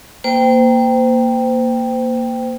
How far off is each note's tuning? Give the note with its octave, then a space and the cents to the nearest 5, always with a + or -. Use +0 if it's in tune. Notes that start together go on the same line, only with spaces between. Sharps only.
A#3 +0 C5 -30 G5 +0